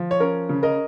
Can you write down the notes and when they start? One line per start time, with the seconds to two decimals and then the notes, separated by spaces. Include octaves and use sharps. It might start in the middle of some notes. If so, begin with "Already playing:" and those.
Already playing: F3
0.11 C#5
0.20 C#4 A#4
0.49 C#3
0.63 A#4 D#5